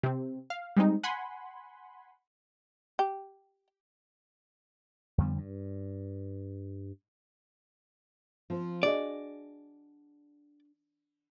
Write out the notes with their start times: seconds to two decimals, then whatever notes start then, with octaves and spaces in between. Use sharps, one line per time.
0.03 C3 C4
0.50 F5
0.77 G3 G#3 C4 D#4
1.03 F#5 G#5 B5 C6
2.99 G4
5.18 F2 D3 G3 B3
5.38 G2
8.50 F3 C4
8.83 D4 F#4 G#4 D5 D#5